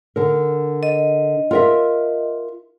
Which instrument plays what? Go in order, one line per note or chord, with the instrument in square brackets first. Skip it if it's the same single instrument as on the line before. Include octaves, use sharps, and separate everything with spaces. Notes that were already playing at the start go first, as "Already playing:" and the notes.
[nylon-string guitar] D3 A#4
[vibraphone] D#5
[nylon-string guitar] F4 A#4 E5